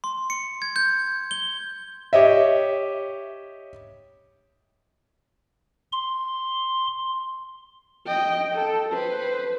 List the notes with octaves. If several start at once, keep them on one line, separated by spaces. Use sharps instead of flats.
C6
C#7
G#6
G6
G7
G4 C#5 D#5 E5
C6
D#5 G5
A4
B4 C5